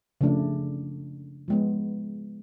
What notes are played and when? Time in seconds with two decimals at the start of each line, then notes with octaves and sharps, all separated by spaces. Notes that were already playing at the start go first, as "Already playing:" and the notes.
0.21 C#3 F3 A3 D4
1.48 F3 G#3 B3